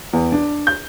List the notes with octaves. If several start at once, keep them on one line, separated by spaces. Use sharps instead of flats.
E2
D4
G6